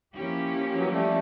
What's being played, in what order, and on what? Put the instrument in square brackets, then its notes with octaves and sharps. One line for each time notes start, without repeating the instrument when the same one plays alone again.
[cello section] F3 A#3 C#4 E4 G4
[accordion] E3 F#3
G3 A3